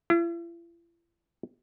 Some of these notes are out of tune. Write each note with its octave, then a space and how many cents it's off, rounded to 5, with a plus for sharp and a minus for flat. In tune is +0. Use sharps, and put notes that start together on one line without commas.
E4 +45